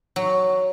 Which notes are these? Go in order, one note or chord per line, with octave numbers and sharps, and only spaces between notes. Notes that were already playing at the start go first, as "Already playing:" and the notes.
F#3